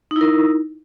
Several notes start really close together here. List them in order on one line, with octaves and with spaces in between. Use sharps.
D#4 E4 A#4